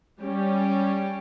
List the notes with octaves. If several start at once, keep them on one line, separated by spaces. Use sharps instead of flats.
G3 C#4 G4